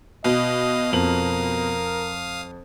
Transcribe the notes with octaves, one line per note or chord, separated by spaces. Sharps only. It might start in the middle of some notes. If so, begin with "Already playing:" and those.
B2 D#5 F5 D#6
F2 A#4 F#7